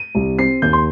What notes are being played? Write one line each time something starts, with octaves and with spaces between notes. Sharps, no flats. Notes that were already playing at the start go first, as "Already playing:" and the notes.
Already playing: D#7
C2
C4 C7
D#2 G6
C6